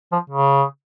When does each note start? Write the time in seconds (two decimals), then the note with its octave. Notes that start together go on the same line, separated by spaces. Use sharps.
0.12 F3
0.30 C#3